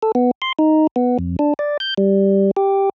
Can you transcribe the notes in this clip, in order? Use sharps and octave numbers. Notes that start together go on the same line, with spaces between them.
A4
B3
C6
D#4
B3
F2
D4
D5
G6
G3
G4